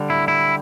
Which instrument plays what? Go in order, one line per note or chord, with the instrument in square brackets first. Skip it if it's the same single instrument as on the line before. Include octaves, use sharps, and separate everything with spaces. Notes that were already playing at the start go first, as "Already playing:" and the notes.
Already playing: [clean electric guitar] D3 G3
E4
E4